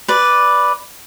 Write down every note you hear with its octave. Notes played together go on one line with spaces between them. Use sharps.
B4 D5